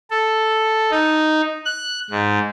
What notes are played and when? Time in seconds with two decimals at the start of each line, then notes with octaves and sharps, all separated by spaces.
0.10 A4
0.91 D#4
1.65 F#6
2.10 G#2